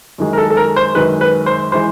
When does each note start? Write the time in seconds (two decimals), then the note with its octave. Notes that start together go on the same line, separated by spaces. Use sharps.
0.18 F#2 D#3 G#3
0.33 A#4
0.38 A4
0.50 A4
0.57 A#4
0.76 C5
0.95 F#2 D#3 G#3 B4
1.21 B4
1.46 C5
1.72 E3 G#3 C5